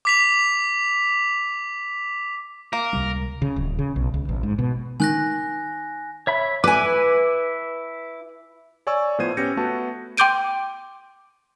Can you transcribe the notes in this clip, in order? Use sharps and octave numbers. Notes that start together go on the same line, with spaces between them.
D6 B6 F7
A#3 A#4
C#2 C3 G3
C#3
D1
C#3
B1
C#2
A1
G#2
B2
D#3 G#5 F#6 A#6
C#5 E5 B5
E4 B4 G#5 D6
C#5 D5 G#5 C#6 E6
A2 F3 B3 C5 G#6 D#7
B3 C#4 G4 G6 A#6 C#7
A3 B3 F#4 A5
G5 C6 D6 G6 D7 D#7